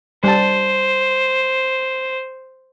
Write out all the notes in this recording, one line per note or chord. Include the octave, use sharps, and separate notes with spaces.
G3 C5 A5